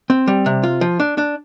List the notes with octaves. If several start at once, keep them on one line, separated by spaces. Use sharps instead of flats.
C4
G3
C3
F4
F3
D4
D4